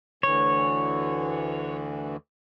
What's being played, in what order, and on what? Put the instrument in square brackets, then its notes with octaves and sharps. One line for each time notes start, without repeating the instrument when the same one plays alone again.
[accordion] D2 D3 E3 [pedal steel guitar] C#5